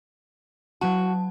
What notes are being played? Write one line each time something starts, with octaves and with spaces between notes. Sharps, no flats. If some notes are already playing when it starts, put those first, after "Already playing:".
F#3 F#4 A5